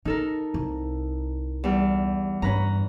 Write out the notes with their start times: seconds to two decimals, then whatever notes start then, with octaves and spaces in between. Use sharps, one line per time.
0.05 C#3 D#4 A4 A#4
0.54 C2
1.64 E2 G3
2.42 G2 C#4 B4 A#5